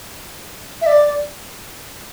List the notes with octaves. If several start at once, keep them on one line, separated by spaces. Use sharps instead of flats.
E5
D5